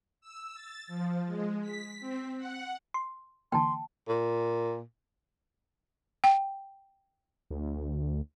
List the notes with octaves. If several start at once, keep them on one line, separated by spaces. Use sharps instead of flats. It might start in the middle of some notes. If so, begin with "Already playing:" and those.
E6
A6
F3
G#3
B6
C4
F#5
C6
D3 E3 A#3 G5 A5 C6
A#2
G5
D2